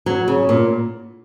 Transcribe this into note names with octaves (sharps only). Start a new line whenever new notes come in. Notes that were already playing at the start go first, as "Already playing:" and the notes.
F#3
C#3
A#2